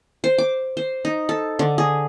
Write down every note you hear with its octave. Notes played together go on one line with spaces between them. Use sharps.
C5
D6
C5
D#4
A4
D3
G#4